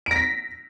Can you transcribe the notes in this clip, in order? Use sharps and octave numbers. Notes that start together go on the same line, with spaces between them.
A#6 B6 D7